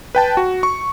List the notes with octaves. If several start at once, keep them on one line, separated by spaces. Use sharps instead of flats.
B4 G5 A5
F#4
C#6